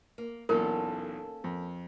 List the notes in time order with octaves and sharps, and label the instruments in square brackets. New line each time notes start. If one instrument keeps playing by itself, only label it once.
[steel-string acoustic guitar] A#3
[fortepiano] B1 E2 A#2 [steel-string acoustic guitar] A#3 C#4 A4 [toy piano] A#4
[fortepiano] F2